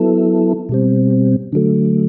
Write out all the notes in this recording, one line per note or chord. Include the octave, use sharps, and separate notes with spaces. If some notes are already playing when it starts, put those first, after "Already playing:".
Already playing: F#3 B3 E4 A4
B2 G3 C4
D3 F#3 A3